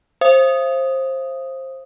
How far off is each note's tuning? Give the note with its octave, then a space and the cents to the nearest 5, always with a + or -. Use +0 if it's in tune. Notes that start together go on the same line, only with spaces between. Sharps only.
C5 +20 F5 -45 D#6 +0